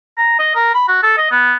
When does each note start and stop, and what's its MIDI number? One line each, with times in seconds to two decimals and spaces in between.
0.17 0.37 82
0.39 0.54 75
0.55 0.74 70
0.74 0.85 83
0.88 1.02 66
1.03 1.17 69
1.17 1.27 75
1.31 1.56 59